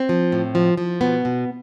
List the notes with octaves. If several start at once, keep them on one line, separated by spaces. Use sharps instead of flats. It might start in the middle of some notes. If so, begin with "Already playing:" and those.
Already playing: C4
F3
A2
F3
F3
B2 B3
B2